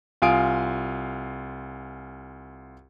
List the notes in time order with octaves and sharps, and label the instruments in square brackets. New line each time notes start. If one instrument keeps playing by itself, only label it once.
[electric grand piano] C2 F4 F5 G#5 D#6 D7